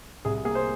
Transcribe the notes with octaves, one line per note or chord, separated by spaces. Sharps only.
C2 G#4
A#3 G#4
C5